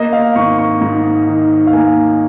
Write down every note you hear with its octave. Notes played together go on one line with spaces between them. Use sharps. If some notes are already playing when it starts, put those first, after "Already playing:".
Already playing: A#3 D#5
F5
G#1 C#6
C#6
G#2
D#3
F5
A#3 G#5